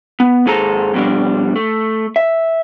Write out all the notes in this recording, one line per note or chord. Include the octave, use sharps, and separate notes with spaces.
B3
D#2 G#2 G#4 A4 C5 A#5
F2 B2 G3 D4
A3
E5